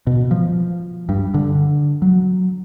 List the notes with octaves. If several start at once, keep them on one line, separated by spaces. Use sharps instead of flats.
B2
F3
G2
D3
F#3